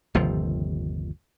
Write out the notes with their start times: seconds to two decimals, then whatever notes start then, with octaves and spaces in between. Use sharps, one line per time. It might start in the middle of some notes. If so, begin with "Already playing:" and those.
0.15 G1 D#2 C3 F3